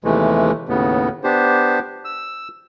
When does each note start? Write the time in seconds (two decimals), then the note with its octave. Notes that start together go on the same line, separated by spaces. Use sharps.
0.04 D#2 C3 E3 G#3 A3
0.69 D#2 A2 C#3 B3
1.24 B3 D4 G4 C5
2.05 E6